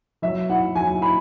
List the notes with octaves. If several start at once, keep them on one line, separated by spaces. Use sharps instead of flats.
F#3 E5
E4 F#5
F#3 G#5
E4 B5